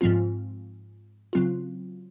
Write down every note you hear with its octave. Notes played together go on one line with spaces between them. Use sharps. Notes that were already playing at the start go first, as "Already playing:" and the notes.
G#2 F3 C4 F4
C#3 F#3 C4 F4